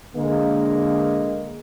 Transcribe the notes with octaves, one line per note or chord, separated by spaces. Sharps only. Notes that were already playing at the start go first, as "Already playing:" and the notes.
D3 G#3 A#3